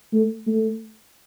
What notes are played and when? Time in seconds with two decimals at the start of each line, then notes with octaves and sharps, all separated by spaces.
0.13 A3
0.47 A3